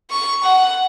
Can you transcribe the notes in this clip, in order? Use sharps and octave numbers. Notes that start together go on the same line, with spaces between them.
C#6
F#5